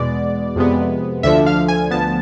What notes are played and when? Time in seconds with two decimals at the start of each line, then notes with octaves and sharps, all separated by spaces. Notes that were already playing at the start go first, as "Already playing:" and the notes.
Already playing: E2 B2 G#3 B3 D5
0.56 F2 C3 G#3 B3
1.23 D2 D3 F3 E5
1.46 F5
1.68 G#5
1.91 D2 D3 F3 B3 A5